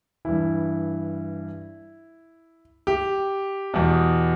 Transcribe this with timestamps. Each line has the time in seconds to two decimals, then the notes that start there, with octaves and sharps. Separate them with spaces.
0.25 G2 E3 E4
2.87 G4
3.74 E2 B2